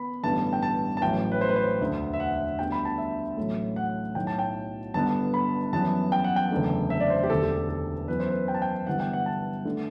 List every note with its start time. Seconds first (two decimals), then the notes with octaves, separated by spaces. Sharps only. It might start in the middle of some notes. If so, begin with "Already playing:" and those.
Already playing: B3 B5
0.23 A1 G2 D3 G3 B3 A5
0.53 G5
0.63 A5
0.97 A5
1.02 A1 A2 F#3 G5
1.32 B4
1.41 C5
1.49 B4
1.56 C5
1.80 E1 D2 D3
2.13 E5
2.20 F#5
2.58 D2 D3 G3 B3 G5
2.72 B5
2.85 A5
2.98 E5
3.37 A1 A2 F#3 A3
3.76 F#5
4.15 B1 A2 F#3 G5
4.27 A5
4.39 G5
4.94 G1 G2 D3 G3 B3 A5
5.34 B5
5.73 F#2 E3 G3 B3 A5
6.12 G5
6.24 F#5
6.36 G5
6.51 F#1 E2 D3 A3
6.90 E5
7.00 D5
7.10 C5
7.23 G4
7.30 E1 D2 D3 A3 A4
7.42 G4
7.56 A4
7.69 A4
8.08 F#2 E3 B3 B4
8.20 C5
8.31 B4
8.48 G5
8.54 A5
8.62 G5
8.87 G1 G2 E3 G3 B3 F#5
9.00 G5
9.13 F#5
9.26 A5
9.65 D3 A3